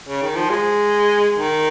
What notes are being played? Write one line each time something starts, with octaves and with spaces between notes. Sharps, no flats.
C#3
D#3
F3
G#3
D#3